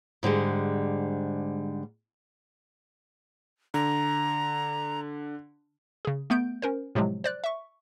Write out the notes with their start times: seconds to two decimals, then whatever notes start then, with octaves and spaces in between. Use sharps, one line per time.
0.23 G#2 D3 G3 G#3
3.74 D3 A#5
6.05 C#3 G#4
6.30 A3 B3 G6 D7
6.62 C#4 A#4 C5
6.95 A2 C3 F3 F#3 G#3
7.24 C5 D5 F#6
7.44 E5 C#6